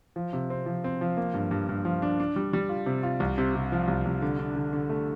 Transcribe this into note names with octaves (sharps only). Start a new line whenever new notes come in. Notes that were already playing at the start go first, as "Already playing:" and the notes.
F3
C3
C4
F3
C4
F3
A#3
G2
G2
G2
F3
D4
D4
G3
G3
F4
C3
F4
C2
C3
C3
F3
C2
C2
D3
D4
D3
D3
A3